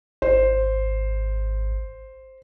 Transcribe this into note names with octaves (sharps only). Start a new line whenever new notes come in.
G#1 C5